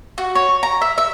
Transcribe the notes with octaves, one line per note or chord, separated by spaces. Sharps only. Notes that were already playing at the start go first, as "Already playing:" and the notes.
F#4
C#5
A#5
E5
E5